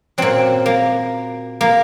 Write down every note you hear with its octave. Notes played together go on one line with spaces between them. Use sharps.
A#2 F#3 C4
A#3
A#3